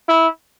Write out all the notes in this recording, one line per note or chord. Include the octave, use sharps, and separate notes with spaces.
E4